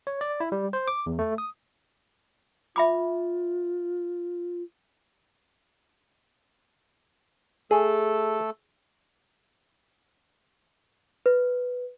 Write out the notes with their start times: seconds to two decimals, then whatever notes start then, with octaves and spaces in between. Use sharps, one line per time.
0.07 C#5
0.21 D5
0.40 E4
0.52 G3
0.73 C5
0.88 D6
1.06 E2
1.19 A3
1.38 D#6
2.76 F4 E5 B5 D6
7.71 A3 G#4 A4
11.26 B4